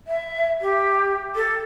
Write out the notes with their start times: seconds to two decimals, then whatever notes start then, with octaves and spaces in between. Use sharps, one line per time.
0.07 E5
0.61 G4
1.35 A4